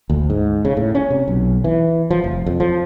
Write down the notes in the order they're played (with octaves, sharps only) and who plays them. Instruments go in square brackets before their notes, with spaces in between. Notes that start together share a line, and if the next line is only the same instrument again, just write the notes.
[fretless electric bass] D2
G#2
C#3
A2
C#4
C3
B1
E3
F3
F1
F2
F3